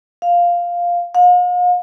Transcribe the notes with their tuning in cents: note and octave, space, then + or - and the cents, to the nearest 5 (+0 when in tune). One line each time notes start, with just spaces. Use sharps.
F5 +0
F5 +45